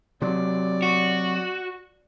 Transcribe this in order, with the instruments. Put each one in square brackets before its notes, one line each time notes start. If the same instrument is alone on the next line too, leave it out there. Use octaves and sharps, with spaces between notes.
[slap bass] C3 F#3 [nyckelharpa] D5
[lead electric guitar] F#4